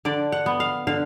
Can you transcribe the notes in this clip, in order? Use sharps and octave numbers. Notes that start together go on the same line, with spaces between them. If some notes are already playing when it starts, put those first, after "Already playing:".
D3 D5
F#5
B3
F5
D3 F5